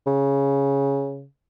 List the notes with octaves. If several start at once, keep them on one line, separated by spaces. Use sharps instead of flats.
C#3